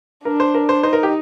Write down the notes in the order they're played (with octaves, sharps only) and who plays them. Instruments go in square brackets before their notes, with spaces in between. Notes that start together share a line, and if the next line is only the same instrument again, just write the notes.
[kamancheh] D4 [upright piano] A#4
[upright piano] C5
A#4
C5
[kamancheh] D#4 [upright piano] C5
[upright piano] A#4
G4